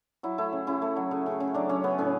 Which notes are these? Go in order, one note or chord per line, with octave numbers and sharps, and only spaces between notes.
F#3 E4
A3 E4
C#3
C#3 E4
A3
F#3
C#3
C#3
C#3
F#3 D4
F#3 C#4
C#3 B3
A2 C#4